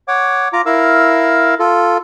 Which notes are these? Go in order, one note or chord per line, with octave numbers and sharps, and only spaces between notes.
C#5 F#5 D6
F4 A#5 D6
E4 A#4 F5 E6
F4 A4